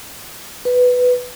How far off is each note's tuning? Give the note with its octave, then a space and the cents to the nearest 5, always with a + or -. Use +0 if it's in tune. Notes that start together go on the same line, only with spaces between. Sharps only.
B4 +5